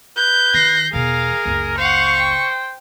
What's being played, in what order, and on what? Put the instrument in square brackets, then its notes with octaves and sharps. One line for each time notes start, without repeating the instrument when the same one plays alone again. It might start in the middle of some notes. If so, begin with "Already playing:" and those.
[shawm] B4 [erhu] G6
[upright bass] D#3 [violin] A#6 C7
[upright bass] E2 B2 [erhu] G#4 [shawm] A#4 [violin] F5
[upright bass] F#1 C#2
[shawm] C5 [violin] F5 F#5 [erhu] C#6
[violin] G5